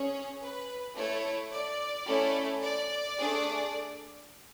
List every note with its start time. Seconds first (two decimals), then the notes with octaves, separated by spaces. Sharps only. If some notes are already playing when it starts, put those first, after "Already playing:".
Already playing: C#4 G#4 C#5
0.42 B4
0.97 A3 E4 A4 C#5
1.52 D5
2.08 A3 C#4 E4 A4
2.62 D5
3.18 A3 D4 G#4